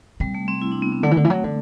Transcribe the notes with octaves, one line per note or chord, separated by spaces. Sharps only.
C3 G3
A3
C4
E4
D4
B3
C4
D3 A3
E3
D3
E3
F#3
D3